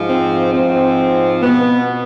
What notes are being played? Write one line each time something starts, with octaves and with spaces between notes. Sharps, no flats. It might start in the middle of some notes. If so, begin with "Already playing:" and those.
Already playing: G#2 F3
C4
G#2 F3 C4
B2 B3